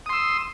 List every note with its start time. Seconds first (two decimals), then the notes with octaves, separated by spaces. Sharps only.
0.06 D#6
0.09 C6
0.13 E6